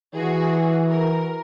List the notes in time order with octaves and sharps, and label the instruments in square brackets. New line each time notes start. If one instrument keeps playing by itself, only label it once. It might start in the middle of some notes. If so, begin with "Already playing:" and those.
[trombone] E3 [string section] F#4 G#4
[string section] A#4